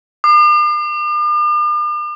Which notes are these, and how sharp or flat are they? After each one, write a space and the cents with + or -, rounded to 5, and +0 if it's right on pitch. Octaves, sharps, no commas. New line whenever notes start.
D6 +45